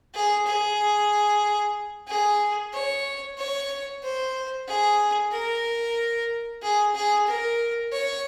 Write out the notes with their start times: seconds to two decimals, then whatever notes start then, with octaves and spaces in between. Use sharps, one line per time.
0.14 G#4
0.46 G#4
2.08 G#4
2.73 C#5
3.38 C#5
4.03 C5
4.67 G#4
5.32 A#4
6.62 G#4
6.95 G#4
7.27 A#4
7.92 C#5